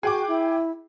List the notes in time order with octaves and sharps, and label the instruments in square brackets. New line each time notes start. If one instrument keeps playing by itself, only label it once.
[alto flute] F#4 [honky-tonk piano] G#4 G5 D6
[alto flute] E4